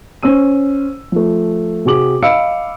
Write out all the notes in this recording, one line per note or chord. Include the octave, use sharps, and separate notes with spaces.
C#4 C5 E6 D#7
F3 A3
C3 C4 F#4 G#4 D6 F#7
D#5 F5 B5 E6 C#7 D7